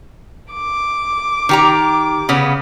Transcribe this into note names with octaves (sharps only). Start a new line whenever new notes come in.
D6
D#3 G4 A#5
C#3 B3 C#4